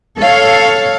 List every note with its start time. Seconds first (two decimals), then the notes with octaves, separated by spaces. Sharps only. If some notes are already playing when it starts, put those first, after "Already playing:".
0.20 A4 C#5 F5